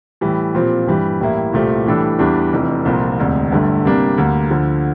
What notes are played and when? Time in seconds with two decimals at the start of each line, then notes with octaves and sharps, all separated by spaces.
0.21 A2 E3 G3
0.55 A#2 F3 C4 G4
0.87 G2 E3 G3
1.20 A1 A2 G3 A#3 E4
1.53 C2 A#2 A3 C4 G4
1.86 A2 E3 G3 D4 A4
2.19 E2 E3 G3 D4
2.53 F1 F2 E3
2.85 C2 A#2 F3 A#3
3.18 E1 D2 C3
3.52 G1 G2 D3 A3
3.85 C3 G3 A#3 D4
4.18 D2 D3 G3 A#3
4.50 D2 D3 F3